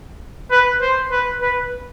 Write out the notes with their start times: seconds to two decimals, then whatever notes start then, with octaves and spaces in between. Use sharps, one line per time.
0.51 B4
0.82 C5
1.11 B4
1.42 B4